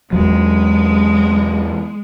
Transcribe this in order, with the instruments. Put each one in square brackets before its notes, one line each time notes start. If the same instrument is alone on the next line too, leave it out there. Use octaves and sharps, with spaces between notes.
[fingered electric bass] E2 F#3 [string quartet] G#3